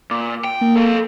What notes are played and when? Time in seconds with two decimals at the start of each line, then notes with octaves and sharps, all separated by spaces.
0.11 A#2 D6
0.44 G5
0.61 A#3
0.76 A4 F5